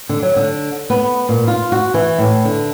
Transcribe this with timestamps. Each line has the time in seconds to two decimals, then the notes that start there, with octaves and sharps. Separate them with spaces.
0.09 D3
0.22 F#3
0.36 D3
0.90 B3
1.29 A#2
1.48 F4
1.72 F#4
1.94 E3
2.18 A2
2.45 D3